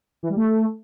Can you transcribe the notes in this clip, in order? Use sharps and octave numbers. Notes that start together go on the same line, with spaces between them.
E3
G3
A3